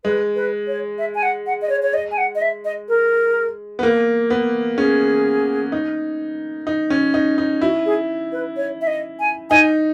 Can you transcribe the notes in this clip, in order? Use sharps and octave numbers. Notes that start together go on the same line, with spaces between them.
G#3 B4
B4
C#5
E5
G#5
F#5
F#5
D#5
C#5
C#5
D#5
G#5
F#5
D#5
E5
D#5
A#4
B3
A#3
B3
C#4 G#4
D#4
D#4
C#4
D#4
D#4
E4 F#4
G#4
B4
C#5
E5
D#5
G#5
D#4 G#5